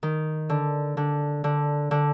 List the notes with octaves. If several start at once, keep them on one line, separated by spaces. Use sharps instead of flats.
D#3
D3
D3
D3
D3